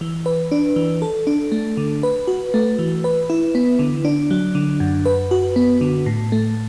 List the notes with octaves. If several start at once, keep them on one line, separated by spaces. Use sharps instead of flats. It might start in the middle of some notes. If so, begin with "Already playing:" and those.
E3
B4
D4
E3
A4
D4
A3
D3
B4
F#4
A3
E3
B4
E4
B3
D3
D4
F#3
D3
F#2
B4
F#4
B3
D3
A2
A3